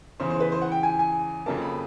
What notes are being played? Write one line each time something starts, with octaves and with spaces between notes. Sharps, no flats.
E2 C#3 E3 C5
C5
B4
C5
F#5
G5
G#5
G#5
F2 C#3 F#3 A#3 A5
B5